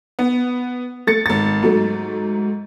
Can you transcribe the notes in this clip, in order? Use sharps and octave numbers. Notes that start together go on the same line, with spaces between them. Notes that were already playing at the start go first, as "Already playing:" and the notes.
B3
A3 A6 C#7
G#1 A6
G#2 F#3 A3